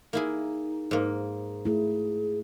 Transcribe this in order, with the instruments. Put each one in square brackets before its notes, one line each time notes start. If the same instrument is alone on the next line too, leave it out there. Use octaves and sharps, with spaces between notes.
[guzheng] A#3 E4 G#4 [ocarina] D#4
[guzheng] G#2 A#3
[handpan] A3 E4 [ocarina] G#4